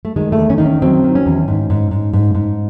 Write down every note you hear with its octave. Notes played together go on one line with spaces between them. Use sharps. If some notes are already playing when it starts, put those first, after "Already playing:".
A3
D#3 G#3
A3
E2
C#4
D#3 D#4
C#4
F#3 C4
D#3
C#4
E2
G#2
G#2
G#2
G#2
G#2